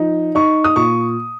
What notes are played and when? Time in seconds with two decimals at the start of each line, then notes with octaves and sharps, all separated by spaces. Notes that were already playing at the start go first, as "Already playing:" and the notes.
Already playing: F3 D#4
0.35 D#4 C#6
0.64 D#6
0.76 A#2 C#6